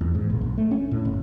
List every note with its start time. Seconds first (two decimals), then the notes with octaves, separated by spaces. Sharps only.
0.01 E2
0.15 G#2
0.30 A#1
0.41 B1
0.58 A3
0.71 C#4
0.91 A2
1.05 F#1